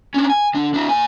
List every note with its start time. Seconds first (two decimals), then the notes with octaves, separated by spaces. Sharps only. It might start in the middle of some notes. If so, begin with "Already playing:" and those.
0.14 C#4 D4
0.30 G#5
0.54 D3 D4
0.74 D4 E4
0.88 A#2 G#5